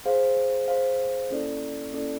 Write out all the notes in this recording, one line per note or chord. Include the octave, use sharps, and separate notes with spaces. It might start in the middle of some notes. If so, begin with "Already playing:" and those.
G#4 C5 F5
G#4 C5 F5
A#3 C#4 E4 A4 D5
A#3 C#4 E4 A4 D5